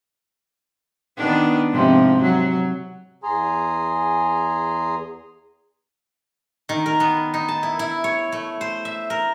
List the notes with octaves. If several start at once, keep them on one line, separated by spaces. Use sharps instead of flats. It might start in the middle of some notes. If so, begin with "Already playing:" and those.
D#3 B3 D4
G#2 C3 F3
F#3
E2 G#4 G#5 A#5 C6 D#6
D#3
A#4
B3
D#4
A5
E4
E4
C#5
A3
C5
E5
A#4